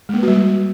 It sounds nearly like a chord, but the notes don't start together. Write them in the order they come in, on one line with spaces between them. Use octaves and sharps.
G#3 A#3 B4 F#4 G3